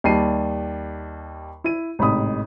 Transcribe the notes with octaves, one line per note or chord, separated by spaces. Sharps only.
D#2 G3 D5 A5 C7 D#7
E4 D#7
A1 G#2 C3 B5 D#6